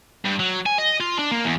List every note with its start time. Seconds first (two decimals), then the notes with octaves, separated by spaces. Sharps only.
0.25 G2
0.39 F#3
0.66 G#5
0.78 D#5
1.00 F4
1.19 D4
1.31 A#3
1.45 E2